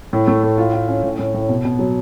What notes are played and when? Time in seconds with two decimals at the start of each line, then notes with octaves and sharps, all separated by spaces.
0.13 A2
0.28 A3
0.43 A2
0.58 F4
0.74 F4
0.88 C#4
1.03 A2
1.19 A2
1.34 A2
1.49 B2
1.65 B2
1.79 F#3